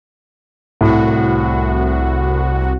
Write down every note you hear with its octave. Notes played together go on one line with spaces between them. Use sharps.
C2 A2 F#4